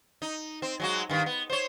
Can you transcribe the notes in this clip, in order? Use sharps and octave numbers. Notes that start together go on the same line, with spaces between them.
D#4
C4
F#3 G#3 F#4
G2 D#3
B3
C5 C#5